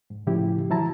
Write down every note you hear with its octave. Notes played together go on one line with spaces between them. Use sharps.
G#2
A2 C#3 F3 E4 G4
E3 F#3 E4 A5 A#5